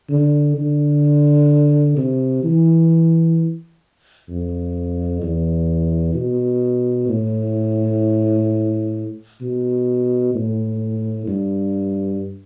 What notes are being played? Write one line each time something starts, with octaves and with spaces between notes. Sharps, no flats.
D3
D3
C3
E3
F2
E2
B2
A2
B2
A2
G2